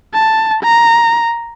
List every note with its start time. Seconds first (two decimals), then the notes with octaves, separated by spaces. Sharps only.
0.14 A5
0.63 A#5